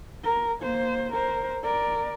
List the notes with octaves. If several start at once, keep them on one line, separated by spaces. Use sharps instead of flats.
A#4
A#3 C5
A#4 C5
A#4 D5